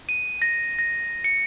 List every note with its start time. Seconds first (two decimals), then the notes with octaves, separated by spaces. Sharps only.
0.09 D#7
0.42 A#6
0.79 A#6
1.24 C#7